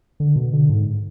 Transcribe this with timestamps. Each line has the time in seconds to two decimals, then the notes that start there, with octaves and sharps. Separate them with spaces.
0.20 D3
0.36 B2
0.53 D3
0.70 G#2